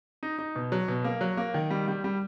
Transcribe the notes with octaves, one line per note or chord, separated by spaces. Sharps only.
D#4
D#4
B2
F#3
B2
A#3
F#3
A#3
D#3
G3
G3
G3